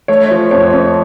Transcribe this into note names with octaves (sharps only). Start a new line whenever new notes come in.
A3 C#5
F3
F2 C#5
F2